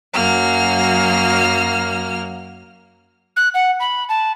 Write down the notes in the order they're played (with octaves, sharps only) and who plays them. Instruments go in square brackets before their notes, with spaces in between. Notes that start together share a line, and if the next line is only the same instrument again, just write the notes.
[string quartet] F#2 F#3 A#3 F6
[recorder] F#6
F#5
B5
A5